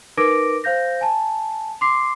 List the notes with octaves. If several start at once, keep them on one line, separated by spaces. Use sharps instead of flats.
D#4 A#4 B4 D6 A#6 D7
C5 F5 G6 A#6
G#5 A5
C6 D6 C7